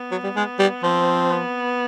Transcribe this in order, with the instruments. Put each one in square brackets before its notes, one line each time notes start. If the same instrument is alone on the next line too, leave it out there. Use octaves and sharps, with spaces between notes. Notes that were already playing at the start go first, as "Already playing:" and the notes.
Already playing: [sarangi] B3
[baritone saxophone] F#3
G3
G#3
G3
[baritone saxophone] F3 [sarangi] C4
[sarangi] B3